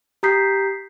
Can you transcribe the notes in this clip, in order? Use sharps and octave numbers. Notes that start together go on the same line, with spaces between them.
G4 A#5 D#6 G6 B6 C7